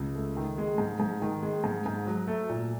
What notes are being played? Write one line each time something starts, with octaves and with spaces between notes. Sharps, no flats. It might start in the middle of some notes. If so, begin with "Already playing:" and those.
Already playing: C#2
A3
D#3
G#3
G#2
G#2
D#3
G#3
G#2
G#2
F#3
A3
A#2